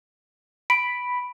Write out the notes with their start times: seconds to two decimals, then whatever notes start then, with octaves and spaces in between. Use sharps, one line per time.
0.70 B5 D7